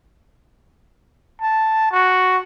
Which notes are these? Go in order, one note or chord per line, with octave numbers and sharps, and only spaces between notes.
A5
F#4